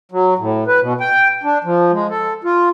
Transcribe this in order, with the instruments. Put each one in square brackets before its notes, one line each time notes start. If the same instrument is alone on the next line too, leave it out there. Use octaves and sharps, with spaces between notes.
[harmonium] F#3
A2
B4
B2
G5
D4
F3
G#3
A4
F4